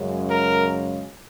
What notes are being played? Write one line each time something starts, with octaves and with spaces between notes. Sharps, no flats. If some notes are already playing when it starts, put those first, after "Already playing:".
Already playing: F#2 C#3 G#3
A#4